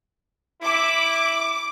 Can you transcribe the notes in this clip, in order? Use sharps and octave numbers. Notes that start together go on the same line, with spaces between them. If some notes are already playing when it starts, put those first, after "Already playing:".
E4 D6